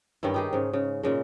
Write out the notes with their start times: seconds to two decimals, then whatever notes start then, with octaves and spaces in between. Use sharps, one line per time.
0.23 G2 D#3 C#4 E4
0.34 D#4 G4 G#4
0.53 G#2 C#3
0.73 C#3
1.03 A#2 C#3 G#3